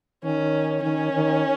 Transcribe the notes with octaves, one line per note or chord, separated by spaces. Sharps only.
D#3 C#4
D#3 C#4
D#3